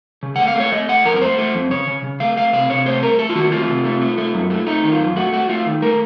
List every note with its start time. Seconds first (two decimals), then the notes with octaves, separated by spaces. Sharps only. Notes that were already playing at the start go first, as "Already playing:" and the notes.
0.23 C#3
0.36 A3 F#5
0.48 F5
0.55 A3 C#5
0.72 A3 D#5
0.89 A3 F#5
1.05 F2 A#4
1.16 A#4
1.22 A3 C5
1.38 A3
1.55 F2
1.71 C#3 C#5
1.87 C#3
2.04 C#3
2.20 A3 F5
2.37 A3 F5
2.53 C3 F5
2.70 C3 C#5
2.86 A3 C5
3.02 A3 A#4
3.19 A3 A4
3.29 F4
3.35 D#3 F#4
3.52 A3 F4
3.68 C3
3.85 A3
4.01 A3
4.18 A3
4.34 F#2
4.50 A3
4.67 A3 D#4
4.83 D#3
4.92 F4
5.00 F#2
5.16 A3 F#4
5.33 A3 F#4
5.49 A3 F4
5.66 D#3
5.82 A3 A#4